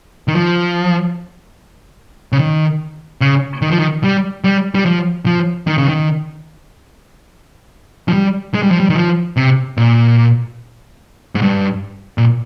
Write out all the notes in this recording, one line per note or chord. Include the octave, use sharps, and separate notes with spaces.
D#3
F3
C#3
D#3
C#3
D#3
F3
D#3
G3
G3
G3
F3
F3
D#3
C#3
D#3
F3
G3
G#3
G3
F3
G3
D#3
F3
C3
A#2
G#2
G2
A#2